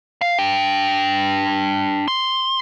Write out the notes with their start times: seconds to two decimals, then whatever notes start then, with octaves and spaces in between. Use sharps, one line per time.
0.21 F5
0.39 D4 G5
2.08 C6